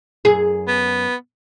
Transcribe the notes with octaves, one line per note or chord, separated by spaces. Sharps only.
F#2 G#4
B3